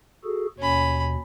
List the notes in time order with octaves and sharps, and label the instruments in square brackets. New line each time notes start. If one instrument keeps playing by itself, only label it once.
[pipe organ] F#4 G#4 A4
[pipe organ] D#2 B2 [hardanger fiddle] C#4 B5